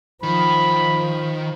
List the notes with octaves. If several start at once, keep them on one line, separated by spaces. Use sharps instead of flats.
D#3 F3 B5